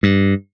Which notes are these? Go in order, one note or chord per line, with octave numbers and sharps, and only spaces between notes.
G2